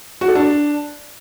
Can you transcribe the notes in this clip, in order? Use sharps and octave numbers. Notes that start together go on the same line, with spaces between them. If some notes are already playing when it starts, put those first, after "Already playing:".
F#4
A4
D4